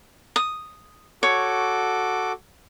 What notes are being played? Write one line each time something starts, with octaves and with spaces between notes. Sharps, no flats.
D#6
F#4 A4 C#5 D6